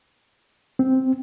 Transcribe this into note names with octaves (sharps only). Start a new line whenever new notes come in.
C4